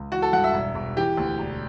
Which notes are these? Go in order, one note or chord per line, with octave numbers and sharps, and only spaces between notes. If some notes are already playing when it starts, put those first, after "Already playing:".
Already playing: C#2
E3 F#4
A4
G2 F#5
E5
E1
E1
E3 G4
D2
E1